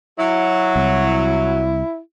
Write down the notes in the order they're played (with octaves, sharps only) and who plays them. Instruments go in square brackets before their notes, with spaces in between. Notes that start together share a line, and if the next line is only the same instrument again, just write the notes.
[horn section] F#3 [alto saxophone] E4
[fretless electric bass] C2